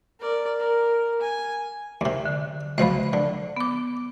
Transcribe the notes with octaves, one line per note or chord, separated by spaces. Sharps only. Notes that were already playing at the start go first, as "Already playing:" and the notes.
A#4 D5
A#4
G#5
D#2 C3
D3
C#2 B2 F3 C5 B5
D3
B3 D6